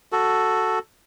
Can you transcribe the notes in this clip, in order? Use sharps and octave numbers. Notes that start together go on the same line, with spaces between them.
F#4 A4